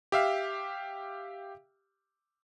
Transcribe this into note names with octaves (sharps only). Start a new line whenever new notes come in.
G4 E5 F5